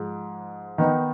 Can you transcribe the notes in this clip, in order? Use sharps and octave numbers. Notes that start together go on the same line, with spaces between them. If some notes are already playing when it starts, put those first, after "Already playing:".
Already playing: G#2 F3 G#3
D#3 B3 D#4